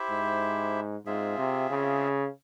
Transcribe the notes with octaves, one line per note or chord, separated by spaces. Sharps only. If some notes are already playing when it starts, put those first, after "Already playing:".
Already playing: E4 G4 C5 E5
G#2
G#2 C4 F4 G#4 E5
C3
C#3